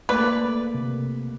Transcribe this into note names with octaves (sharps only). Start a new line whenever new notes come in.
A3 A#3 B4 D5
C3